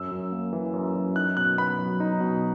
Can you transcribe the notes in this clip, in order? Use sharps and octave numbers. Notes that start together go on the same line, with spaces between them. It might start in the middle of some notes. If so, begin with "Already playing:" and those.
Already playing: F#2 E6
F#2
A#3
E3
F#2
F#2
D#4 F#6
B2 F#6
B3 B5
F#3
D#4
B2